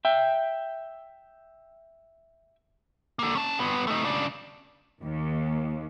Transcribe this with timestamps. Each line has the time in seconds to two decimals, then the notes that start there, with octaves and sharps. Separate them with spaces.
0.05 E5 G5
3.19 A#3 A4
3.35 C#4 A5
3.59 G2 B3
3.87 A3 D#4
4.05 C#3 D4
5.03 D#2